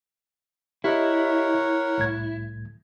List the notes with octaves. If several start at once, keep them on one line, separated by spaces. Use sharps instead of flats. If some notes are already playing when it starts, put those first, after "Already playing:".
E4 G4 A#4 C#5 D#5 F#5
C2 A2 G#6